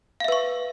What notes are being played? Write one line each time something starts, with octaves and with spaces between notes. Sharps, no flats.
B4 E5 F5 C#6